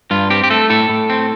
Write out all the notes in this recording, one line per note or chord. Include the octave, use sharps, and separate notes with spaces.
G2 F4
C4 G4
G4
A3 A4
A2 A4
A2
C4